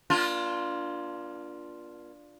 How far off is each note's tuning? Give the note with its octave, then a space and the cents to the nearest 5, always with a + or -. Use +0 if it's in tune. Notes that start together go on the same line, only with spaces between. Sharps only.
A#3 +45 D4 +0 F4 +0